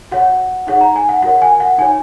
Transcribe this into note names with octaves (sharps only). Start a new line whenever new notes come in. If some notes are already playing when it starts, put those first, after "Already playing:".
F#4 C#5 F#5
D#4 G#4 C#5 F#5
A#5
G#5
F#5
F#4 A#4 C#5 F#5
G#5
F#5
D#4 F#4 C#5 G#5